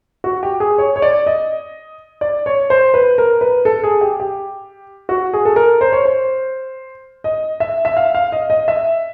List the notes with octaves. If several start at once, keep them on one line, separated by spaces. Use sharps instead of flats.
F#4
G4
G#4
C#5
C#5
D5
D#5
D5
C#5
C5
B4
A#4
B4
A4
G#4
G4
G4
F#4
G#4
A4
A#4
C5
C#5
C5
D#5
E5
E5
F5
F5
D#5
D#5
E5